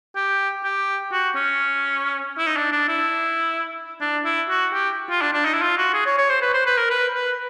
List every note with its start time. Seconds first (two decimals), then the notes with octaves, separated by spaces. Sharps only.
0.16 G4
0.64 G4
1.12 F#4
1.36 C#4
2.38 E4
2.47 D#4
2.57 D4
2.72 D4
2.88 E4
4.01 D4
4.25 E4
4.49 F#4
4.73 G4
5.10 F4
5.22 D4
5.33 D4
5.45 D#4
5.54 E4
5.62 F4
5.78 F#4
5.94 G#4
6.06 C#5
6.18 C#5
6.30 C5
6.42 B4
6.54 C5
6.66 B4
6.77 A#4
6.90 B4
7.14 B4